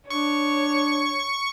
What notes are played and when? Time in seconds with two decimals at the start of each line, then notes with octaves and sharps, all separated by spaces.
0.10 D4 C#5 C#6